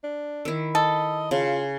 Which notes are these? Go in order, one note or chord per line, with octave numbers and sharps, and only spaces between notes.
D4
D#3 E4
A4 D#5
C#3 F4